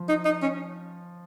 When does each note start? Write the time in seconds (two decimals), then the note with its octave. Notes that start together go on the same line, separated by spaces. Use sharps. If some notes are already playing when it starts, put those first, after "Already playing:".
Already playing: F3
0.09 D#4
0.25 D#4
0.42 C#4